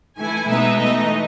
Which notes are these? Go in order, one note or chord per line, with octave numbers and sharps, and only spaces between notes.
E3 A3 E4 G#5
B2 G#3 B3 D#4 E5
E3 A3 D#4 D#5